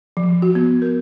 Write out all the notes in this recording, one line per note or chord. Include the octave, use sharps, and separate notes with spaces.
F3
F#4
B3
A#4